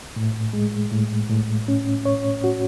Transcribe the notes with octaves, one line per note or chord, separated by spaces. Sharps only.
A2
G#3
A2
A2
C#4
C#5
F#4